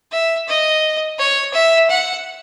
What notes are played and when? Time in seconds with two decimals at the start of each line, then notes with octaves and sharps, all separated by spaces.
0.12 E5
0.48 D#5
1.19 C#5
1.53 E5
1.90 F#5